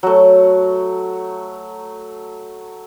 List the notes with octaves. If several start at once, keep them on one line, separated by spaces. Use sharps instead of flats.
F#3 A3